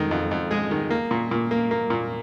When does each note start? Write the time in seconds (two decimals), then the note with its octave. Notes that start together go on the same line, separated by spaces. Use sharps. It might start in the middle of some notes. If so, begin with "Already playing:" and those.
Already playing: F2 D#3 G#3
0.11 F2
0.31 F2
0.51 G#3 G#4
0.71 D#3
0.90 A#3
1.11 A#2
1.31 A#2
1.51 A#3
1.71 A#3
1.90 A#2